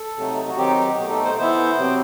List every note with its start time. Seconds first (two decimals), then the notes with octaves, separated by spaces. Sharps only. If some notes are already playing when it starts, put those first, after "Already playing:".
Already playing: A4
0.17 C3 F#3 A3 D#4
0.49 F#4
0.58 D#3 F#3 C4 D#4 G4
0.78 G4
0.98 B2 A3 D#4 G4
1.11 A4
1.25 C5
1.38 E3 B3 E4 C5
1.78 C3 F#3 C4